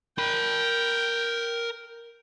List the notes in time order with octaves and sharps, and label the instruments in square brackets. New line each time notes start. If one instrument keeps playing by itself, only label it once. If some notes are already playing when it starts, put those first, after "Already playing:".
[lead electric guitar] A#4 B5 [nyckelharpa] G5